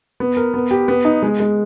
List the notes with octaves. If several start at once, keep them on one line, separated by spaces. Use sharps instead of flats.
B3
A#4
B3
G4
B3
D#4
G#3
G#3